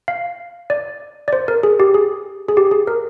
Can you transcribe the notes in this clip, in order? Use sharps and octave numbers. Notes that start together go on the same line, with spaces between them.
F5
D5
D5
C5
A#4
G#4
G4
G#4
G#4
G4
G#4
A#4